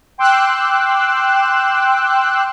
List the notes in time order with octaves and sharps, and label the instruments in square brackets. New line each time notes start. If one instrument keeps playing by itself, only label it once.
[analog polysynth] G5 C6 D6 E6 F#6